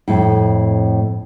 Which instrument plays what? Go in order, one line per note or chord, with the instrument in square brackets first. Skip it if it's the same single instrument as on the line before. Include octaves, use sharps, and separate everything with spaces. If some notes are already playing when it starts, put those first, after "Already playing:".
[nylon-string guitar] F2 A2